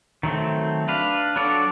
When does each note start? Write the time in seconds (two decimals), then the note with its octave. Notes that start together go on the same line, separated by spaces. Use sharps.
0.23 D#3 F#3 A3 C4
0.88 D4 B4 F5
1.36 F#3 D4 A4 C#5 D5